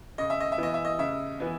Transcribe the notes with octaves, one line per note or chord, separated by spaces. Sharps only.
C#3 D#5
E5
D#5
E5
E3 B3 E4 D#5
E5
D#5
C#3 E5
E3 B3 E4